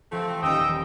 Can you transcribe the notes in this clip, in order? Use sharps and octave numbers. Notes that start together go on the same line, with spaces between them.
F3 A3 C4
D#1 D#4 G5 D#6 E6